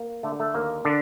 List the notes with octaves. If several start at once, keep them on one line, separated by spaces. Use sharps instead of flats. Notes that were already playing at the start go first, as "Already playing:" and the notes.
Already playing: A#3
D3 A3
A3
D#2 A#3
D3 D4